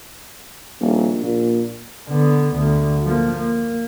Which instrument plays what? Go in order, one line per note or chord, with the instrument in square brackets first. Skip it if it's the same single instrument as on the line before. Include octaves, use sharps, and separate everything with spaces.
[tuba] D#1 [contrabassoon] A#1
[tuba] A#2
[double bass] D3 B3
D2
F3 A#3
A#3